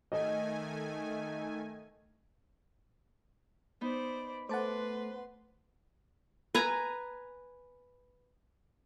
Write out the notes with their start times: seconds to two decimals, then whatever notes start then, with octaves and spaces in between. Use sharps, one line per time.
0.12 D#3 A3 D#5 G#5
3.81 B3 D#4 C5 D5 B5
4.49 A3 B4 C5 F#5 A5 C6 D6
6.55 B4 G#5 A#5